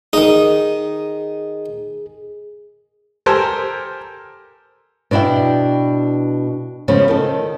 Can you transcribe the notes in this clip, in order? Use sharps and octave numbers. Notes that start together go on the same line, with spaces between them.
D#3 D#4 G#4
G4 A4 A#4 C5 G5 G#5
B2 D4 E4 D5 G5
C#3 F3 G#3 B3
D#3 A4